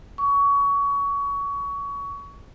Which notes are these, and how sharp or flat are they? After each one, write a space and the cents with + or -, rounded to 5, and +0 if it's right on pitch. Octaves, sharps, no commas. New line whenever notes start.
C#6 +25